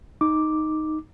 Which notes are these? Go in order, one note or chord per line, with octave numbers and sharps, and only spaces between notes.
D#4 D6